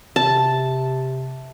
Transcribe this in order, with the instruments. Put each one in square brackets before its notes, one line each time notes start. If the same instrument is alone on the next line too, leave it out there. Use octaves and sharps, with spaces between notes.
[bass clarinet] C3 [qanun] A5